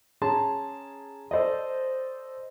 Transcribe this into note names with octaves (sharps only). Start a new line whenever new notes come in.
C#4 G#4 A5 A#5 C6
A4 C5 D5 D#5